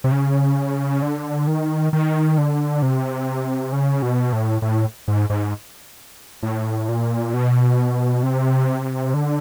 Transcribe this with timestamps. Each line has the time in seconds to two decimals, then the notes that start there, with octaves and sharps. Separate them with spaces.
0.04 C3
0.12 C#3
1.02 D3
1.47 D#3
1.93 D#3
2.38 D3
2.82 C3
3.72 C#3
4.02 B2
4.33 A2
4.62 A2
5.08 G#2
5.30 G#2
6.43 A2
6.89 A#2
7.34 B2
8.23 C3
9.14 D3